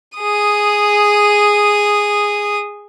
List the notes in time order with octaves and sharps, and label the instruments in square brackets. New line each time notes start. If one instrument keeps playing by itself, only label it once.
[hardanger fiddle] G#4 D#6